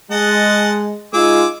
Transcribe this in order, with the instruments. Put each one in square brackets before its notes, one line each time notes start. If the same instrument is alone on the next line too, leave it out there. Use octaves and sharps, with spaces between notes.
[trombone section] G#3 [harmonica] D#5 F#5 A5
[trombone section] G#3 D#4 F4 [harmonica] G#4 D6 E6